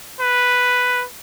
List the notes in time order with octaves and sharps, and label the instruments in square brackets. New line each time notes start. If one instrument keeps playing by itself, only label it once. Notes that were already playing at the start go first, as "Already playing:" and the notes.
[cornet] B4